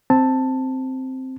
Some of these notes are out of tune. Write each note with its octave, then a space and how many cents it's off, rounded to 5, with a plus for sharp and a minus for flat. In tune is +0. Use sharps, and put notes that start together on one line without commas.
C4 +0 A5 +10